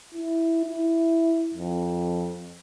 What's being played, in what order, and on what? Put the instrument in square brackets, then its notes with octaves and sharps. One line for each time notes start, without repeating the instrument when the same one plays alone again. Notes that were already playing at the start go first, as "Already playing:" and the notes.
[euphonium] E4
E4
F2